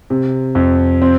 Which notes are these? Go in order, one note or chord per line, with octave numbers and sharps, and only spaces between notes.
C3
F2
C4